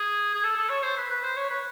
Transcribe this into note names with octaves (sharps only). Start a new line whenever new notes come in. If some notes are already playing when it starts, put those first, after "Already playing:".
Already playing: G#4
G#4
A4
A4
C#5
C5
B4
B4
C5
C#5
B4